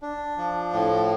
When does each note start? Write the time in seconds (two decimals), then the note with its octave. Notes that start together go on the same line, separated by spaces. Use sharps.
0.02 D4
0.38 F3
0.73 A2